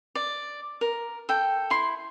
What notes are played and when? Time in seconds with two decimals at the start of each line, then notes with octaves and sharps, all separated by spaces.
0.15 D5
0.81 A#4
1.29 A4 G5
1.70 E4 C6